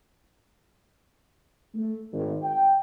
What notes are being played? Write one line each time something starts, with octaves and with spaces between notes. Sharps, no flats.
A3
G#1
G5